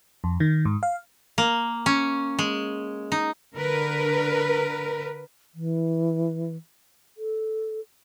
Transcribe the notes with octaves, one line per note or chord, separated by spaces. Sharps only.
F2
D#3
G#2
F5
A#3
C#4
G#3
D#4
D3 A#4 B4
E3
A4